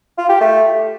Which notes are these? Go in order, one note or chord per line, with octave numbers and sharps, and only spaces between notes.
F4
G4
A3